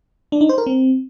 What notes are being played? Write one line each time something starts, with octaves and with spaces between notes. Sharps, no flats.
D4
D#4
C5
A#4
C4